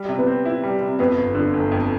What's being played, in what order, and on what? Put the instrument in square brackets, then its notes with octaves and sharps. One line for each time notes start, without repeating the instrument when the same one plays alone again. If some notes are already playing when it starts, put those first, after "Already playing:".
Already playing: [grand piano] G3
C3
[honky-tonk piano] B3
[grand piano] C4
E4
G3
C3
[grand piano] F2 [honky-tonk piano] B3
[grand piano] G1
D3
G1
F2